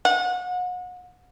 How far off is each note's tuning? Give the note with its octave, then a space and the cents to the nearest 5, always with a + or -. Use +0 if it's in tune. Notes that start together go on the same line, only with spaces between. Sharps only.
F#5 -35